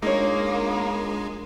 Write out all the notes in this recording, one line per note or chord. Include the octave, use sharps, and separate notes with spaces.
G#3 A#3 D4 D#4 F4 A#4 C#5